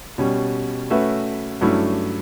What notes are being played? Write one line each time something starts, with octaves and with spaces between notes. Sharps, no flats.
B2 G3 C#4
A3 C#4 F#4 B4 E5
G2 F#3 A3 C#4 E4